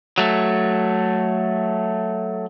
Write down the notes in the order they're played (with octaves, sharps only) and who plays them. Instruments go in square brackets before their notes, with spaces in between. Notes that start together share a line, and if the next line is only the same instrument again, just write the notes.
[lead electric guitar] F#3 A3